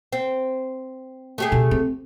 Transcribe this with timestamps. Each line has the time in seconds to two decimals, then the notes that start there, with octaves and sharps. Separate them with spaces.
0.13 C4
1.38 A3 G4 G#4
1.52 B2
1.71 C4